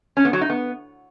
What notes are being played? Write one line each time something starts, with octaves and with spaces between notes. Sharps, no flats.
C#4
B3
F#3
D#4
B3